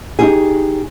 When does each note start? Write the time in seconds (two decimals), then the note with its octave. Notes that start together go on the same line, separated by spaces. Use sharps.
0.19 D#4 G4 G#4